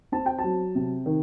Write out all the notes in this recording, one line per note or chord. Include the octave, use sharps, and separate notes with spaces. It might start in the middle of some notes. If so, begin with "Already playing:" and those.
C4 A5
G5
A5
F#3
C3
D#3